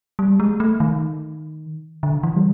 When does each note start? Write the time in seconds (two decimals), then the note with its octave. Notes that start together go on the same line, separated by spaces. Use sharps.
0.19 G3
0.40 G#3
0.60 A3
0.80 D#3
2.03 D3
2.23 E3
2.36 G3